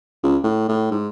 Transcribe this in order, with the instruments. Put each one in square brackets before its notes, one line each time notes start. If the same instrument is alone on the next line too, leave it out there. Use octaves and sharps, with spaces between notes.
[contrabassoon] C#2
A2
A2
G#2